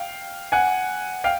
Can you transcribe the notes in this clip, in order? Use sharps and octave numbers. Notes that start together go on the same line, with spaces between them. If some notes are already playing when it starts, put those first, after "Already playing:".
Already playing: F5 G5
F#5 G#5
F5 G5